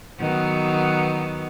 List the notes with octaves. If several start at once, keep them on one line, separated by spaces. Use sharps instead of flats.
D#3 F#3 B3